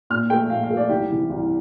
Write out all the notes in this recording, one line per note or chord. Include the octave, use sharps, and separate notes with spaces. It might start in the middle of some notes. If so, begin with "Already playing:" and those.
A#2 F6
A3 G5
A#2 F5
F5
A3
D5
C2 G4
C3 E3
C2